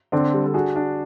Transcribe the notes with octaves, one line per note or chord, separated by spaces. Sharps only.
D3 C4 D4
G3
A4
D4 F#4 G#4
D4